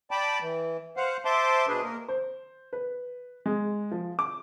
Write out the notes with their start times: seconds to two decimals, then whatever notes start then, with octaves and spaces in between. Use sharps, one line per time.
0.11 D5 G5 A5 B5 D6
0.41 E3
0.97 C5 F5 F#5
1.25 C5 E5 A5 C6 D6
1.68 B2 D4 G#4 B4
1.83 A#3 A#4
2.08 C5
2.73 B4
3.46 G#3
3.91 F3
4.19 D6